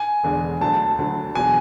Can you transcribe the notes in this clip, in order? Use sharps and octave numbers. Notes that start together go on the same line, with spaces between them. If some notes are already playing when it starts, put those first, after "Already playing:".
Already playing: G#5
E1 E2 D3 G#3 D4
D2 D3 F#3 A5
D2 D3 F#3
E2 B2 F#3 G#5